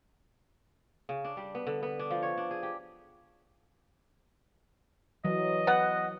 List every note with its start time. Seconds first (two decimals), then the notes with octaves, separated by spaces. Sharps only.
1.09 C#3
1.24 D4
1.37 G3
1.55 B3
1.67 D3
1.83 B3
1.99 D4
2.10 F3
2.22 C#5
2.37 D4
2.51 G#4
2.63 G4
5.25 E3 F#3 D#5
5.67 B3 F#5